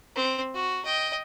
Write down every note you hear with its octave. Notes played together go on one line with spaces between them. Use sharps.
C4
F#4
D#5 G5